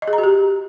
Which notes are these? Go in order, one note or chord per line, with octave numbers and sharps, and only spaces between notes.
D#5
G#4
A#5
F#4
G4